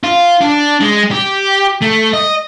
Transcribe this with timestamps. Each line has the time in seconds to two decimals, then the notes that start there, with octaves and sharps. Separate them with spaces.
0.03 F4
0.41 D4
0.81 G#3
1.11 G4
1.82 A3
2.13 D#5